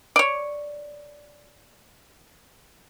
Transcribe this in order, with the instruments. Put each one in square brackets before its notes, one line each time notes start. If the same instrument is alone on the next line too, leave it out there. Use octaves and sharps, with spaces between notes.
[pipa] C#5 D5